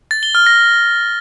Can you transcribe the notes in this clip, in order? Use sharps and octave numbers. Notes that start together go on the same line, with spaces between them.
A6
G7
F6
A#6